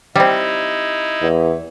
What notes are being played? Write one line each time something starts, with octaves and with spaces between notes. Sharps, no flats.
G3 C4 D#4 E4
E2